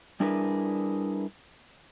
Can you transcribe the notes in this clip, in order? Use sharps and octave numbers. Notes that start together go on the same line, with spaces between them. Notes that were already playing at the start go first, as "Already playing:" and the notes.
G3 D4 E4 G#4 A#4 B4